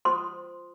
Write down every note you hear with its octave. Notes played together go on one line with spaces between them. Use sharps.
F4 C5 C6 D#6